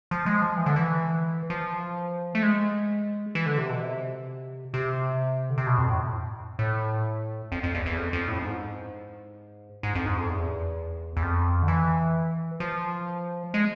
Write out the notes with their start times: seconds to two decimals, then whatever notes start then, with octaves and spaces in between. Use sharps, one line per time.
0.11 F3
0.26 G#3
0.42 F3
0.57 E3
0.66 D3
0.76 E3
1.50 F3
2.35 A3
2.43 G#3
3.35 E3
3.46 D3
3.58 C3
3.70 B2
3.81 C3
4.74 C3
5.50 D3
5.58 C3
5.67 B2
5.78 F2
5.89 A2
6.59 A2
7.52 F2
7.63 F2
7.75 E2
7.86 E2
7.97 F2
8.13 F2
8.28 A2
8.39 F2
8.44 G#2
9.83 G#2
9.95 F2
10.06 G#2
10.17 F2
10.29 E2
11.17 E2
11.23 F2
11.62 D3
11.68 E3
12.60 F3
13.54 G#3